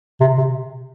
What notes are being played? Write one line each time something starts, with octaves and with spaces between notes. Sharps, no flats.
C3
C3